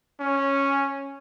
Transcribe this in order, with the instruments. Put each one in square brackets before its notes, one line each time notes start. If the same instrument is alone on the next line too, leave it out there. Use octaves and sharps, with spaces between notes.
[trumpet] C#4